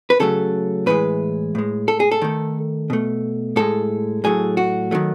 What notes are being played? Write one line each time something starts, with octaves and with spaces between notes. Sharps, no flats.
B4
C#3 F#3 A3 A4
A2 E3 G#3 B4
A2 G#3
A4
G#4
A4
D#3 A3
B2 A3
A2 G#3 A4
A2 F#3 A3 G#4
F#4
D#3 F#3 A3